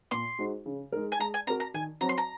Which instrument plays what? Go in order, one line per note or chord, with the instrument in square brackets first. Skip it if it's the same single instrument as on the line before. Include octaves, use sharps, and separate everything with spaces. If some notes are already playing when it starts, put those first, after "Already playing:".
[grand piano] A#2 [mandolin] C6
[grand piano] G#3 D#4 F#4 C5
C#3
G#3 D#4 A#4
[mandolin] G#5
[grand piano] G#3 [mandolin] A#5
[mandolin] G#5
[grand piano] C4 F#4 A#4 [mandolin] A#5
[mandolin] A#5
[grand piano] D#3 [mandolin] G#5
[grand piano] F#3 C4 F#4 C5 [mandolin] A#5
[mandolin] C6
A#5